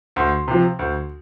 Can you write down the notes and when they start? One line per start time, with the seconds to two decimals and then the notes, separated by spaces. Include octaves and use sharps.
0.16 D2 C6
0.48 C3 F3
0.79 D2